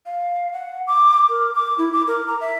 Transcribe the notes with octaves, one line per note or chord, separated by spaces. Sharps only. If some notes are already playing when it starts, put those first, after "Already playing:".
F5
F#5
D6
A#4
D6
E4
D6
A#4
A#5
E5